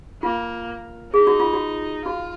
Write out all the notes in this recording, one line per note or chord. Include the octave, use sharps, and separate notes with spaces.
A#3 F4
D#4 G#4
F#4
F4
F#4
F4 F#4